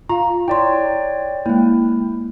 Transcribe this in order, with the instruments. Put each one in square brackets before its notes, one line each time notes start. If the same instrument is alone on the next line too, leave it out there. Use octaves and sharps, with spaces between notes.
[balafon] F4 F5 [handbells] A#5
[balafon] E4 C6 [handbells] C#5 D5 G5
[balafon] G#3 A#3 [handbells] E4